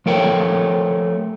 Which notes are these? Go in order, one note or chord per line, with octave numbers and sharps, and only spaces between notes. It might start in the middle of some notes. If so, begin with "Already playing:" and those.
F3 A3 A#4 C#5 G5